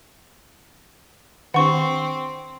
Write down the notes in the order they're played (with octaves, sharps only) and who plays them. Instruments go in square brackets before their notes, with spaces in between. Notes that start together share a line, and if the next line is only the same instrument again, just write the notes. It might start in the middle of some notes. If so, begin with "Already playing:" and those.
[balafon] D#3 D4 G4 [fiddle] C4 [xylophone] F#5 C#6